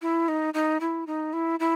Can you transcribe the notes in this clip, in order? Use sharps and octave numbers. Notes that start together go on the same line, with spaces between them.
E4
D#4
D#4
E4
D#4
E4
E4